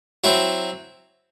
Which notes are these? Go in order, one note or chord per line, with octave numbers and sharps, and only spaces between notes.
F#3 C4 E4